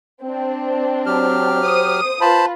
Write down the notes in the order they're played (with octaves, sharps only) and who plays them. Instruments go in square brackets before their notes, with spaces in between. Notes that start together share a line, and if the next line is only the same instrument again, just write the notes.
[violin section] C4 D4
[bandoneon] F#3 G4 F6
[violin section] C5 D#6
[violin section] F4 B4 [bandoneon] C5 A5 B5